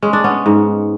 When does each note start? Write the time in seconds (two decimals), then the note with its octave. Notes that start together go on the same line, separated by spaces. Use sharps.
0.02 G#3 C#4
0.13 D4
0.24 B3 C#4
0.46 G#2